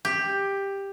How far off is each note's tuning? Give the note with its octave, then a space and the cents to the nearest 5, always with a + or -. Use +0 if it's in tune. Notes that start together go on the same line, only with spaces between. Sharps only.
G4 +10